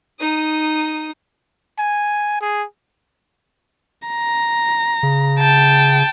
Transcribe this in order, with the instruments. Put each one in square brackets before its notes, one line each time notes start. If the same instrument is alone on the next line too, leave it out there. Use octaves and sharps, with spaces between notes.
[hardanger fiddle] D#4 D#6
[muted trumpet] G#5
G#4
[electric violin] A#5
[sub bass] C#3
[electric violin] G5 A5